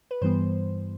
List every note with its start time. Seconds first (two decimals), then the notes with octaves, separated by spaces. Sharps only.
0.11 B4
0.22 G2 E3 G3 B3 C5